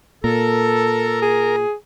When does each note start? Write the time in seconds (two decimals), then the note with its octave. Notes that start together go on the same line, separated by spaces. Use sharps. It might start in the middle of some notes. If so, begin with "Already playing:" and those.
0.24 A#2 A4 A#4
1.22 G#4